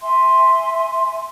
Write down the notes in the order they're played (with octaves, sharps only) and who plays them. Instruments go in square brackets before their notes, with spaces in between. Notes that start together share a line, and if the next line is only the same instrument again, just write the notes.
[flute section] E5 G#5 C6